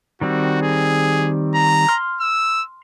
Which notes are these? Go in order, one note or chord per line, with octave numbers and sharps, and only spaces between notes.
D#3 G3 C4 F#4
G#4
A#5
C6 F6
E6